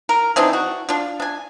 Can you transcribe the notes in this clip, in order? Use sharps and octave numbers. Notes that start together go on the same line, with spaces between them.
A#4
E3 C4 D4 D#4
F#4
D4 F4
D4 G#5